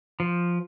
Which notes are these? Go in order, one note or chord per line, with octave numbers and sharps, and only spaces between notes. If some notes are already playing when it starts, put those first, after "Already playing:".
F3